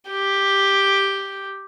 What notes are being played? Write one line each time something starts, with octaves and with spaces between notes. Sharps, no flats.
G4